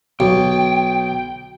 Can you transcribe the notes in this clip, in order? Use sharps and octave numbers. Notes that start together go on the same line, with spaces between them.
B1 G5